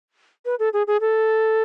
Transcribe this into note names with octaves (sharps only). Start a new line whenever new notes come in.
B4
A4
G#4
G#4
A4